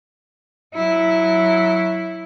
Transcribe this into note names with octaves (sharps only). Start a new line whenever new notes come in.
F#3 E4